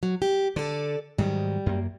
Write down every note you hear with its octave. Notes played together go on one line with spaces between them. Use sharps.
F#3
G4
D3 A4 D5
G#2 D#3 F#3 G3
F#2 A#3